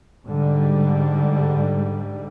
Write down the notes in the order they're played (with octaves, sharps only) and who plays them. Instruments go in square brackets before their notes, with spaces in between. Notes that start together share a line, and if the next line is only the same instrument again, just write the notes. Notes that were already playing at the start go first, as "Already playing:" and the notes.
[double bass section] G#2 D3 G3